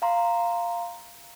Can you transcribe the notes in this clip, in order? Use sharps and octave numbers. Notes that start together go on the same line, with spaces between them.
F5 A#5 C6